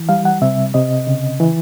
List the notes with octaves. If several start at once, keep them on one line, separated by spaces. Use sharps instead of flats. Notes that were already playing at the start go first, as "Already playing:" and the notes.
Already playing: E3
G3 F5
F#5
C3 E5
C3 D#5
C#3
E3